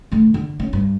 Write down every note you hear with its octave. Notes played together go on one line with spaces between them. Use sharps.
D3 A3
D3
C#4
G2